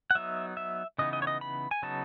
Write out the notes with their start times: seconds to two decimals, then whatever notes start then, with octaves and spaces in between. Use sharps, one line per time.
0.11 F#5
0.15 F#3 B3 D#4 E5
0.57 E5
0.98 C#3 E3 B3 D#4 D#5
1.13 D#5
1.22 C#5
1.27 D#5
1.41 B5
1.71 G#5
1.82 C#3 F#3 B3 D#4 A5